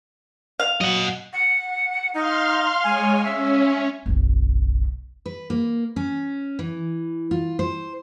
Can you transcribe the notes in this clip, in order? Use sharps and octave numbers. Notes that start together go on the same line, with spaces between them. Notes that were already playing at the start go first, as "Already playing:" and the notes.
F5
F#3 D#5 F#5
F#5
D#4 F5 C6 F6
G#3 C#5 G#5
C#4 E5
F#1 B1
B4
A#3
C#4
E3
F4
C5